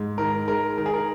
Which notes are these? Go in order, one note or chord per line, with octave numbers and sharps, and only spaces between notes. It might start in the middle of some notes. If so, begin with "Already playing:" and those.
Already playing: G#2
D#3 A#4
G#3 A#4
D#3 A#4
G#4
A#4